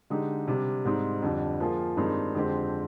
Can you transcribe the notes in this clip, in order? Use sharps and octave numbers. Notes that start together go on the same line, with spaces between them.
D3 G#3 D#4 G4
C3 G3 D4
G#2 G3 C4 D#4
F2 D3 G3
F3 A#3 F4 G#4
G2 D#3 G#3 C4 D#4
F2 D3 G#3 C4 G4